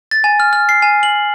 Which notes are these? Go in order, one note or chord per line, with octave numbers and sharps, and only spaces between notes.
A6
G#5
F6
F6
C7
G#5
F#7